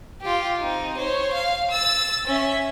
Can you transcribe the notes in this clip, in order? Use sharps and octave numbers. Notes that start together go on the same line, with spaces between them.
F4 G4
C4 D#4
C5 C#5
F5
E6 A6
C#4 E5